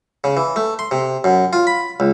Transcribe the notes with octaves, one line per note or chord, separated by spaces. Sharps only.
C#3
E3
A3
C6
C3
F#2
F4
B5
C#2